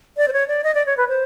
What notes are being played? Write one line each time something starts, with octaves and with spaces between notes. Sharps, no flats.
D5
C5
C#5
D5
D#5
D5
C#5
B4
C5